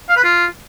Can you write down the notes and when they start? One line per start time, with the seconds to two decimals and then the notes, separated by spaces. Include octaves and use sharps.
0.09 F5
0.16 B4
0.24 F4